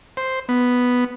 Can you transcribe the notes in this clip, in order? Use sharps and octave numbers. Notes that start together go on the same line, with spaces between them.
C5
B3